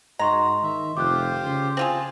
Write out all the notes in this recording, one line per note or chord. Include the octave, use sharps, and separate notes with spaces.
G#2 F#4 D#5 A#5 C6 C#6
D#3 E5
F1 F4 G4 C5 D6 F#6
C#3
C4 F4 G#4 A5